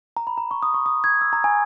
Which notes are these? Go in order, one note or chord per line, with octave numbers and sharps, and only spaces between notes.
A#5
B5
A#5
C#6
D#6
C#6
D#6
G#6
E6
A#5
G#5